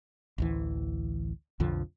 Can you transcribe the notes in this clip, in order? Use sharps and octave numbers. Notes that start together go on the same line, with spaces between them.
A1 D2 E3
B1 F2 D3 F3